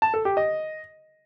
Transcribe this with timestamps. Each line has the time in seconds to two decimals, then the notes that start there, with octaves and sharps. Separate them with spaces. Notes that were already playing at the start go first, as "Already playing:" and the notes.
0.02 A5
0.14 A4
0.25 G4
0.37 D#5